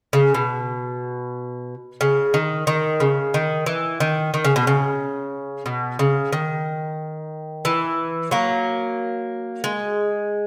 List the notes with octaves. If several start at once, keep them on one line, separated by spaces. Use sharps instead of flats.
C#3
B2
C#3
D#3
D#3
C#3
D#3
E3
D#3
D#3
C#3
B2
C#3
B2
C#3
D#3
E3
F#3 A#3
G#3